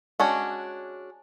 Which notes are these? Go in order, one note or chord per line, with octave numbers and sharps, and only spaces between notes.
G#3 C#4 D4 F#4